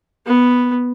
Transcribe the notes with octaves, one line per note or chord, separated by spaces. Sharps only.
B3